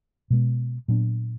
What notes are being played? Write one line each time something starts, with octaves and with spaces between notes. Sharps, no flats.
B2 G#3 B3
A#2 F#3 B3 D4